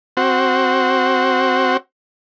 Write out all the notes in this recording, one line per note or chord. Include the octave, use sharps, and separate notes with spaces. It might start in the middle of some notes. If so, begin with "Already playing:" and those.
C4 F#4